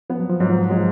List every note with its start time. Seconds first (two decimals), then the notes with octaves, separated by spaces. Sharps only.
0.10 F3 B3
0.19 F#3
0.30 F3
0.40 G#2 F#3
0.50 F3
0.70 F#3 G#3
0.76 F3